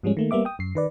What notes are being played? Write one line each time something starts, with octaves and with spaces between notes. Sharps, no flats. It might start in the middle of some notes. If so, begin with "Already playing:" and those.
G#2 F3 G3 G#3 C#4
D#3 A3 A#3
G3 A#3 B3 E5 D6
G5 D#6
F#2 C7
D#3 B4 D5